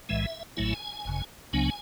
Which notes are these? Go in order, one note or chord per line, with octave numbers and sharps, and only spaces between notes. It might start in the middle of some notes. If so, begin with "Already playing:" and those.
B1 A2 E3 G#3 E5
A1 A2 F#3 A3 E4 G#5
G#1 F#2 C#3
C#2 C#3 F#3 B3 D4 G#5